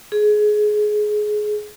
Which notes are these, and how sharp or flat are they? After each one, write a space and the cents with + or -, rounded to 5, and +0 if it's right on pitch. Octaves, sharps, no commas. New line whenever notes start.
G#4 +20